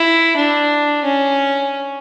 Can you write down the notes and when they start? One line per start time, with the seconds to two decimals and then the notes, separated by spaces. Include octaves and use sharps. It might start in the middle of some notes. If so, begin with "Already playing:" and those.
Already playing: E4
0.36 D4
1.04 C#4